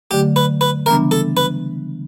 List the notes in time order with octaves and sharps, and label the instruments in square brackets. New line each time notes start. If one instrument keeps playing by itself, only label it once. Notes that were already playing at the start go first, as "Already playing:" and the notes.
[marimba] D3 F#3 A3 [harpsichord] G4
[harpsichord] B4
B4
[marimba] C#3 E3 G3 B3 D4 [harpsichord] A#4
[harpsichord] A4
B4